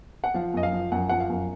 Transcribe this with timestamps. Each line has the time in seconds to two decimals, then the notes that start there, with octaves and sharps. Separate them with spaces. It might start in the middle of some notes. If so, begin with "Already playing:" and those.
0.24 F#5
0.34 F3 F5
0.54 F#2 D#5
0.63 F5
0.72 F3
0.92 F#2 F#5
1.09 F3 F#5
1.20 F5
1.30 F#2